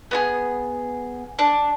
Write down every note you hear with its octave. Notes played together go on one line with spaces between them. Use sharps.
B3 F#4 G#4
D4